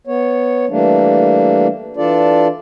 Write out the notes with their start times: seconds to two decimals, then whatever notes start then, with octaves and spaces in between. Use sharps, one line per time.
0.07 B3 C#5
0.69 E3 G3 A3 A#3 D4
1.97 E3 D4 F4 A4 D5